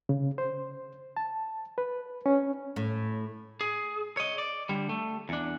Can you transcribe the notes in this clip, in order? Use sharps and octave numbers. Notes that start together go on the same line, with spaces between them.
C#3
C5
A5
B4
C#4
A2
G#4
C#5 D#5
D5
D3 G3
A3
E2 D4